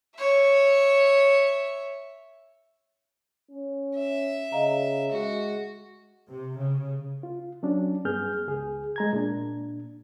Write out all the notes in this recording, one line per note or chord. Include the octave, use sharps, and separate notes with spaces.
C#5 E5
C#4
E5
C#3 D#5 F5 A#5
G#3 F#4
C3
C#3
F4
F#3 C#4 D4
G2 B3 G#4 F6 G6
C#2 G#4
G#3 A#5 G#6
A#2 D4